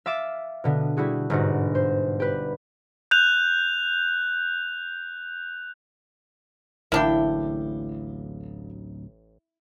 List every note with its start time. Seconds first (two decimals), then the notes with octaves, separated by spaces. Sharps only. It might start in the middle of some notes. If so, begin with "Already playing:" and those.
0.06 E5 F5 D6 A6 E7
0.64 B2 D3 B3
0.97 G3 E4 F#4 G#4
1.30 G1 G#2 F#4
1.75 C5
2.20 G4 B4
3.11 F#6 G6 F7
6.92 D1 A1 D2 A#3 D4 E4 G5